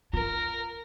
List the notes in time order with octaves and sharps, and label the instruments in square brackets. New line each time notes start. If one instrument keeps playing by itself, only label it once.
[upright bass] F4 [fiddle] A#4